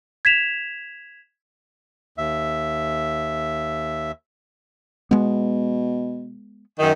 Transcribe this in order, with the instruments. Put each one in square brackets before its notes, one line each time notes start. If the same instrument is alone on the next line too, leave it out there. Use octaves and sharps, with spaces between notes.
[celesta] G#6 B6 E7 F7
[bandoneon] D#2 E5
[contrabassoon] B2 [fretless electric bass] G#3 B3
[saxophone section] F#2 D#3